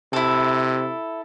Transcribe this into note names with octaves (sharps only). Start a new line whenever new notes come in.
C3 E4 A4